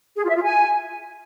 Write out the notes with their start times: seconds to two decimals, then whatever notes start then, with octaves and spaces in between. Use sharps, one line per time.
0.17 G#4
0.23 F4
0.30 E5
0.36 F4
0.42 G#5